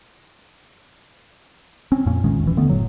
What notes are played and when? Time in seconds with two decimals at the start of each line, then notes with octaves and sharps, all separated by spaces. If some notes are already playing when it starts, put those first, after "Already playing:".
1.92 C4 C#4
2.06 F2 A#2 A#3 C#4
2.24 B1 A#2 D#3 G#3
2.44 D#1 E3
2.57 D3 A3 B3
2.70 F#1 A2 F#3